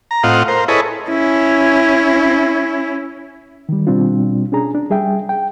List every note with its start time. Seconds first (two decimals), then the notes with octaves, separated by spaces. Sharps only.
0.11 A#5
0.23 A2 C4 F4 D#5 F5 F#5
0.48 A#4 C5
0.68 E4 G#4 A4 B4 C#5 D#5
1.09 C#4 E4
3.69 D#3 G3
3.87 B2 G3 C4 D4 F4
4.52 C#4 D4 G#4 A#5
4.74 D4
4.90 G3 G#4 E5 G5
5.29 G5